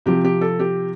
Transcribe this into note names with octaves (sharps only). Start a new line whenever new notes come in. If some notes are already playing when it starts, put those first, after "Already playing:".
C3 F3 G4
G4
A4
G4